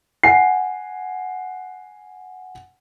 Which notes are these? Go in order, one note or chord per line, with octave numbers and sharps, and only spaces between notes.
F#5 G#5 C7